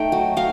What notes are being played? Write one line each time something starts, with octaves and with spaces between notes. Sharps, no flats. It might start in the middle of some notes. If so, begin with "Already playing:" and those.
Already playing: A3 D#4 G5
F#3
F#3 F5